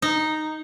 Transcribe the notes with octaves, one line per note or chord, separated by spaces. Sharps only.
D#4